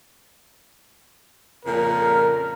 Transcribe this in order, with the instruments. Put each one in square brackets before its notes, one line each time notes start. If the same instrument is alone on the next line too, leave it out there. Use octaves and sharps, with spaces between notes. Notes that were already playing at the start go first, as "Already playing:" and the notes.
[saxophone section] F2 A#2 C#3 [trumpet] A#4